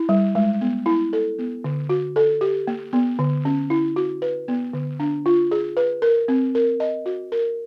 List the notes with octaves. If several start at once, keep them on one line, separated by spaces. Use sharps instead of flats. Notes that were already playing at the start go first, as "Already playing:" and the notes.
Already playing: E4
G3
G#3
B3
E4
A4
B3
D3
F#4
A4
G4
A#3
B3
D3
C#4
E4
F#4
B4
B3
D3
D4
F4
G#4
B4
A#4
C4
A#4
D#5
F#4
A#4